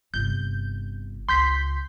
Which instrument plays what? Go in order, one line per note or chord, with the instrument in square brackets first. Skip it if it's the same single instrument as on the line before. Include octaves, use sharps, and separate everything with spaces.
[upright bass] G1 C3 [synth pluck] G6
[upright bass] C#2 [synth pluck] C6 G6 B6